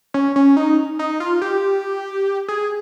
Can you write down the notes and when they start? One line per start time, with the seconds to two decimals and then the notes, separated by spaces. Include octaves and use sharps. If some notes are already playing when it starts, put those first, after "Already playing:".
0.14 C#4
0.36 C#4
0.57 D#4
0.99 D#4
1.20 F4
1.42 G4
2.48 G#4